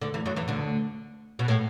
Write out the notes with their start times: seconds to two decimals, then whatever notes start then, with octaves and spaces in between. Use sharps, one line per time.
0.02 D2 D3
0.14 E2 E3
0.26 F#2 F#3
0.36 E2 E3
0.48 D2 D3
1.39 B2
1.48 A2